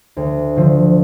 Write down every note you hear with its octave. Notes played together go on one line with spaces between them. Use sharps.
D2
D3 F3